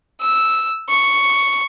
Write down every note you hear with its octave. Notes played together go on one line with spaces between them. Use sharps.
E6
C#6